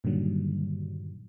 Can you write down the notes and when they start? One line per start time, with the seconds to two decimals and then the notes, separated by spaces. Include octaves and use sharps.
0.04 G2 A#2 D3 D#3 F#3 G3